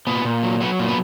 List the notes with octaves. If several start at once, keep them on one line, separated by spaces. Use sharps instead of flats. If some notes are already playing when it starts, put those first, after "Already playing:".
A#2 B3
A#2
F#3
F#3 B3
A#2
B3